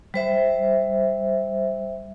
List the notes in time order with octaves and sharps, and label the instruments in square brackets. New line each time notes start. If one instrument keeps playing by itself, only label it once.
[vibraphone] G3 C5 E5